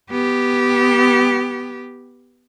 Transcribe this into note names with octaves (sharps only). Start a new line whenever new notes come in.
B3 G4